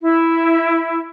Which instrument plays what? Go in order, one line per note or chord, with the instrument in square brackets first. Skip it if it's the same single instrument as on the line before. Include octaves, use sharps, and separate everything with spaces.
[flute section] E4